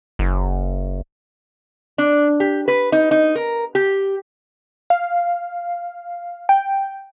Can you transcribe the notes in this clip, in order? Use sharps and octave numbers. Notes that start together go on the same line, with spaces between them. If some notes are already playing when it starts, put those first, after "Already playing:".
F#1
D4
G4
B4
D#4
D#4
A#4
G4
F5
G5